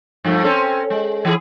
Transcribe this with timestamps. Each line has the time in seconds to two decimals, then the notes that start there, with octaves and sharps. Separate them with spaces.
0.24 G2 F3 A3
0.44 C4 C#4 A4
0.90 G#3
1.25 E3 E4 G#4